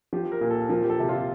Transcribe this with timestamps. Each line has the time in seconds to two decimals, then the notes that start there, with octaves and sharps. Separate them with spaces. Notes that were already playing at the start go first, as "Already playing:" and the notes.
0.13 F3 G4
0.32 A#4
0.41 A#2
0.50 A4
0.69 F3 A#4
0.84 G4
0.90 A4
0.99 C3 G4
1.09 F4